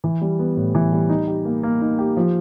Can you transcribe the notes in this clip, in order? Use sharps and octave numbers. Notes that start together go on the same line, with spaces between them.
E3
G3
B3
A2
E3
G3
D#4
G4
A#3
A#3
D#4
G4
F3